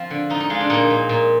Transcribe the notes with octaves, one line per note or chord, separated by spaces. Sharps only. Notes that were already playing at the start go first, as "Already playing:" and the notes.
Already playing: F3 C4
D3
F3 D#4
D#4
G#3 F4
D4
A#2 D#4
A#2
A#2